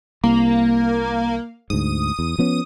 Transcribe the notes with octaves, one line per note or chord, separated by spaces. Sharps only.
C2 A#3
D2 G#2 D#6
E2
F3 B3 C#4